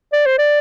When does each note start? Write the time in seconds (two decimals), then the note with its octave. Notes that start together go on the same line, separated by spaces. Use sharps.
0.13 D5
0.26 C5
0.39 D5